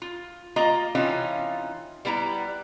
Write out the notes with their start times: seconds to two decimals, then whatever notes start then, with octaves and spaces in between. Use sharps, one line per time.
0.02 F4
0.56 A#3 F4 D#5 A#5
0.95 C3 E3 C#4 D#4 F4
2.05 G3 B3 E4 G5 A#5